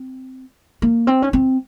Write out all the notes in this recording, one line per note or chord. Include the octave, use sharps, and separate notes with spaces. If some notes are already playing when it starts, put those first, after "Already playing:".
Already playing: C4
A#3
C4
C#4
C4